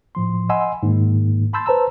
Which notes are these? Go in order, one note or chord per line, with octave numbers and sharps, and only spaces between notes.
A2 F3 C6
D#5 F#5 G#5 B5 C6 E6
G#2 D#3 A#3
A5 B5 C6 E6 G6 A6
B4 C5 A5 A#5 E6